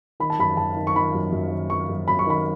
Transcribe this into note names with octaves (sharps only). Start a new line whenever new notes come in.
D#3 B5
A5
F#2 B5
F#2 A5
D#3
C#6
D#3 B5
F#2
F#2
D#3
D#3 C#6
F#2
F#2 B5
C#6
D#3 B5